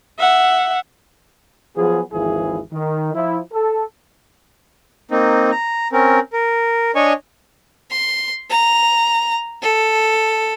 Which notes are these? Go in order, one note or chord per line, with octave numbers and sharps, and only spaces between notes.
E5 F#5
F3 F#3 B3 G#4
G#1 D#2 E3 F3 E4 G#4
D#3
F3 E4
A4
A#3 C4 D#4
A#5
C4 C#4 A#4
A#4
D4 C#5 D#5 G#5 C#6
C6
A#5
A4